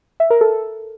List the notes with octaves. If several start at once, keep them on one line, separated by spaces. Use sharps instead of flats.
E5
A#4
A4